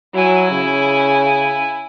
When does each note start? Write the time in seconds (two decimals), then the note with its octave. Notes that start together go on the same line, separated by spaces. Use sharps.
0.15 F#3 E4 G#5
0.51 C#3